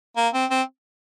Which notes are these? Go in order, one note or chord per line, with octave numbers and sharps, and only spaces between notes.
A#3
C4
C4